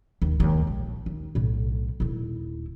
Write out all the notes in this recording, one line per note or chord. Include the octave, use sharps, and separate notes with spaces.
D#2
D#2 G#3
A#1
D#2
B1 A2
D#1 E4